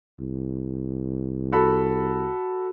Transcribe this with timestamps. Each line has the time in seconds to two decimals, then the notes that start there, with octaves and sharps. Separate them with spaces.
0.20 C2
1.52 F#4 A4 B5